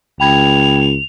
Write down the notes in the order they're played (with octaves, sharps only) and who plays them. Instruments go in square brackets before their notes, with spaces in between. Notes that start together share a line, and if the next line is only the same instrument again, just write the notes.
[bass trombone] C#2 [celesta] G5 B5 G#6 [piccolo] F7